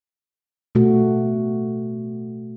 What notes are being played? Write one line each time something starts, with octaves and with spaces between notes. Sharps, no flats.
B2 A3 F#4